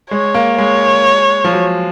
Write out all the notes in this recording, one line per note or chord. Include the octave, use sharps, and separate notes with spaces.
G#3 C#5
A#3
G#3 C#5
F3
F#3